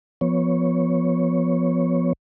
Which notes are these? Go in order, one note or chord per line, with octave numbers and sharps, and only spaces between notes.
F3 B3 C#5